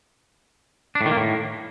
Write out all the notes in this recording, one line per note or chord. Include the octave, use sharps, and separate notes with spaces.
D4
A2
D#3
A#3
A2